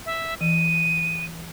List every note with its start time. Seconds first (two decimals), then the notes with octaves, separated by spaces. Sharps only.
0.06 E5
0.41 E3 D#7